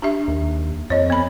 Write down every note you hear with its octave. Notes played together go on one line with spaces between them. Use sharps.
D4 G4 E5
D#2
F2 C#5 D#5
B3 B5